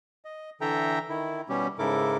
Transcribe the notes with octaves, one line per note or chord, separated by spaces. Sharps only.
D#5
D3 E3 A4 E5 G5 A#5
D#3 E4
B2 G3 C#4 G4
G#2 C#3 E4 A4 A#4 D6